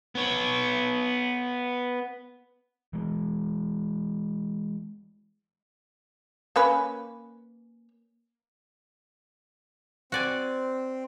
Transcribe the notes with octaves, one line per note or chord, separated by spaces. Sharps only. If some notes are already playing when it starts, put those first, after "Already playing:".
B3 C#5
E3 G#3
A#3 C#4 B4
C4 F#4 D5 G#5